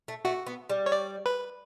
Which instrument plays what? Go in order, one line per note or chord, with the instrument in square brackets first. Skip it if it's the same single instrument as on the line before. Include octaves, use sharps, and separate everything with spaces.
[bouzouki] A3
[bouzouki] A3 [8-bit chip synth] F#4
[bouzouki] B3
G3
[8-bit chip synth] C#5
D5
B4